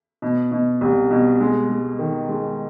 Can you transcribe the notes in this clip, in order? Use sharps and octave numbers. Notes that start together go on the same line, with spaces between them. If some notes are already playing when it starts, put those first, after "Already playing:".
B2
B2
C2
B2
G#3
G#3
D#3
G#3